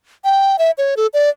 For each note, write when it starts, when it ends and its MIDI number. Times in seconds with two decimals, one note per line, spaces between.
0.24 0.59 79
0.59 0.71 76
0.78 0.95 73
0.97 1.07 69
1.14 1.30 74